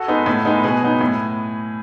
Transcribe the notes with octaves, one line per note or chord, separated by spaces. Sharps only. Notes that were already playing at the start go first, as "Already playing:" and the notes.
Already playing: F#4 A4
G#3 B3 D#4
A2
G#3 B3 D#4
B2 G#4 B4
F#3 B3 D#4
A2